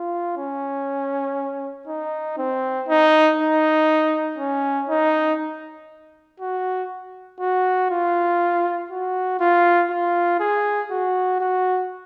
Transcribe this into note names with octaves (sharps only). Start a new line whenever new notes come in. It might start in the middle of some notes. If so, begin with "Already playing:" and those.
Already playing: F4
C#4
D#4
C4
D#4
D#4
C#4
D#4
F#4
F#4
F4
F#4
F4
F4
G#4
F#4
F#4